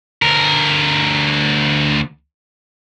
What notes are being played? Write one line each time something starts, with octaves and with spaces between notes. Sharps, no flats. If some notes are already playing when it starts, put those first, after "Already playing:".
D2 A#4